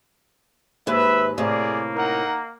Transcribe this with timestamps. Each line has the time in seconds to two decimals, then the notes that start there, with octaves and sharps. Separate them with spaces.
0.87 D#2 G#2 B4 E5
1.38 A2 C3 A#3 G#4 D5
1.95 D#4 A#4 F#5